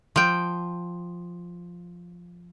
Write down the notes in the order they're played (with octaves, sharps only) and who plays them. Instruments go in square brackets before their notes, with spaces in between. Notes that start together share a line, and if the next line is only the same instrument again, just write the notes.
[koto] F3 G5